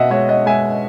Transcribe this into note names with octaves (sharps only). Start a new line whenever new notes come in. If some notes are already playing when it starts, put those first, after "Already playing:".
Already playing: B2 D#5 E5 F#5
G#3 C#5 E5
D#5 F#5
G#3 E5 G#5